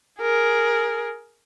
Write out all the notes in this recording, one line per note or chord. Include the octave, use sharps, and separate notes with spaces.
G#4 A#4